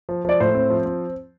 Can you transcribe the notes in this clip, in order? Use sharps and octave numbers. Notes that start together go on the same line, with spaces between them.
F3
F3 D5
A2 C5
C4
F3
C4